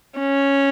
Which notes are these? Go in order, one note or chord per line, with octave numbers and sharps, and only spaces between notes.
C#4